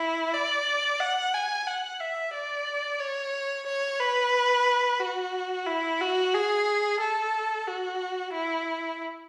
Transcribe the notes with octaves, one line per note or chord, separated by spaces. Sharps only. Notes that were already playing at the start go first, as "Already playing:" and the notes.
Already playing: E4
D5
F#5
G#5
F#5
E5
D5
C#5
C#5
B4
F#4
E4
F#4
G#4
A4
F#4
E4